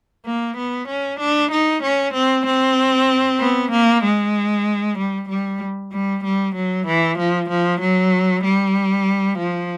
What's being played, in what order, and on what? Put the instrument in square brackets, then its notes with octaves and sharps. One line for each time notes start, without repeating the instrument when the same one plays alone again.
[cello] A#3
B3
C#4
D4
D#4
C#4
C4
C4
B3
A#3
G#3
G3
G3
G3
G3
F#3
E3
F3
F3
F#3
G3
F3